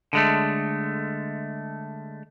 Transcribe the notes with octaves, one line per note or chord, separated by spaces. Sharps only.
D3 G#3 A3